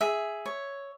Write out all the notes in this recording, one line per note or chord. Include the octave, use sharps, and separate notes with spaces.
G#4 E5
C#5